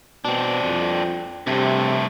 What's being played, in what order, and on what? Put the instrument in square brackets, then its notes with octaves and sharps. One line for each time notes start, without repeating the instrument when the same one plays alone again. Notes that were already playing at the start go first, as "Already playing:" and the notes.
[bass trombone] B2 [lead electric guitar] C4 D4
[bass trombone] F2
[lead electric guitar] G2 A3 [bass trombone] C3